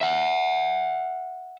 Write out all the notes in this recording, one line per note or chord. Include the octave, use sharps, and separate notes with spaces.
E5 F#5